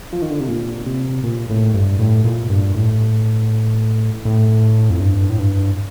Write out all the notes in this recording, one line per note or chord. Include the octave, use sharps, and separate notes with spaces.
F3
D#3
D3
C3
A#2
C3
A#2
A2
G2
A2
A#2
G2
A2
A2
F2
G2
A2
G2